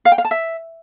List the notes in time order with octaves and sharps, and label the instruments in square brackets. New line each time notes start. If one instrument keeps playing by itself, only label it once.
[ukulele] F5
G5
F5
A5
E5